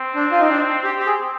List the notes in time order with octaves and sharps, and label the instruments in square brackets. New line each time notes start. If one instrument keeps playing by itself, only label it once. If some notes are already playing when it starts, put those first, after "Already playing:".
Already playing: [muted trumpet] C4
[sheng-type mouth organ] D4
F4
D#4
D4
G4
G4
G#4